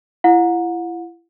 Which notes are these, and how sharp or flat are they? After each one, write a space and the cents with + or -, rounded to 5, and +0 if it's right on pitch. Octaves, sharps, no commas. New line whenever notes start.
E4 +35 F#5 -35